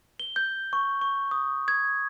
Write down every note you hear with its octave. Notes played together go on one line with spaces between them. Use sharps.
G7
G6
C#6
C#6
D#6
G#6